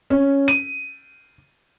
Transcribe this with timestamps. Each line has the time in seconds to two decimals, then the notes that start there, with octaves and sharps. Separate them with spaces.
0.10 C#4
0.48 D#7